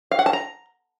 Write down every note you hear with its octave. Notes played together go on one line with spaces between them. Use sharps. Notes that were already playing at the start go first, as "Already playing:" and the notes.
F5
F#5
A5
A#5